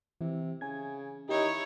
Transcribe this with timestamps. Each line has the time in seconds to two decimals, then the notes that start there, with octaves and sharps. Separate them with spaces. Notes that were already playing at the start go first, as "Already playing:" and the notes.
0.21 C3 E3
0.61 C#3 G#5 G#6
1.29 D#3 D#4 E4 G4 C#5